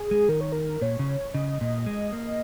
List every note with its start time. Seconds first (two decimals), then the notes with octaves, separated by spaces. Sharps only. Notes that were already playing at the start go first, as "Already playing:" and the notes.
Already playing: G#4
0.11 G#3
0.29 D#3 A#4
0.41 C#5
0.52 A#4
0.81 A#2 C#5
0.99 C#3
1.34 C#3 D#5
1.61 A#2
1.86 G#3
2.13 A#3